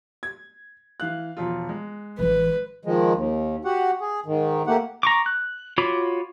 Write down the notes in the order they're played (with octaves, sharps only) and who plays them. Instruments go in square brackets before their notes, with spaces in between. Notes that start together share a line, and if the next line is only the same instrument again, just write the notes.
[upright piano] G#6
E3 F5 F#6
E1 F3 F4
G#3
[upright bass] A1 E3 [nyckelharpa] B4
[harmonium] D#3 F3 G#3
D#2
F#4 G4 F#5
G#4
G#2 D#3
A3 A#3 G4 F#5
[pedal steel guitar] A#5 C#6 D6
F#6
F4 F#4 C#5 B5 D6